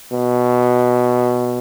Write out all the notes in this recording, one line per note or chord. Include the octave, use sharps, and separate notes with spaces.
B2